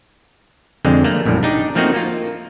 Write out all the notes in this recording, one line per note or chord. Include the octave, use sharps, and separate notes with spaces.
F2 D3 G#3 C4
A3 A#3
A#1 F#2 A2 C3 G3
D4 D#4 G4 D5
F3 A3 A#3 C4 D#4 F#4
A#3 F4